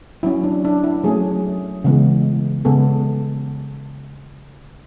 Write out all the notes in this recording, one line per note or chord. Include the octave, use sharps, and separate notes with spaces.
F#3 C#4 E4
D4
D4
E4
F#3 A3 C#4 G#4
C#3 E3 G#3 B3
C#3 G#3 B3 A4